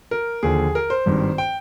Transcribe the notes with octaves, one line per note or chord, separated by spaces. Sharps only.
A#4
D#2 D3 F3 G#4
A#4
C5
G#1 G2 D#3
G5